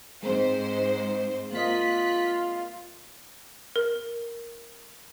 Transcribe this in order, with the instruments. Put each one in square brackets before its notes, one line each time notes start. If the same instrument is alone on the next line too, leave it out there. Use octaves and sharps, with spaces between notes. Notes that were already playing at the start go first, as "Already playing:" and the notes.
[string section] G#2 C5 [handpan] G#3 C4
[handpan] A#3 D#5 [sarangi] F4 [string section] F#6 B6
[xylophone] A#4